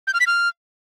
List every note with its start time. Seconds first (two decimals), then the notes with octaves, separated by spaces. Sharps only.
0.07 G6
0.14 F6
0.20 B6
0.27 F6